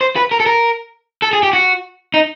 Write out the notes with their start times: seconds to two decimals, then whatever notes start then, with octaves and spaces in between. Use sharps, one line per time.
0.01 C5
0.16 B4
0.31 A#4
0.40 A4
0.46 A#4
1.22 A4
1.33 G#4
1.43 G4
1.53 F#4
2.14 D#4